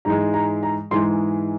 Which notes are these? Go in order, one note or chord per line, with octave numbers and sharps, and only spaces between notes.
G#2 E3 G#3 A#5
A#5
A#5
G#2 E3 G#3 C6